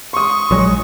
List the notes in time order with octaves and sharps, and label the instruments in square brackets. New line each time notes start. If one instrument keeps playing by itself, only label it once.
[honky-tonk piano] C6 D#6 [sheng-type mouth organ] C#6
[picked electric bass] A#1 F#3 G#3